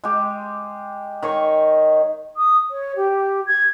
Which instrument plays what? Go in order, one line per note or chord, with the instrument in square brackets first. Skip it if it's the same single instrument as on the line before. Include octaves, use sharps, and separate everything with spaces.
[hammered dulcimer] G#3 G4
D#3 C#5 C#6
[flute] D#6
C#5
G4
G#6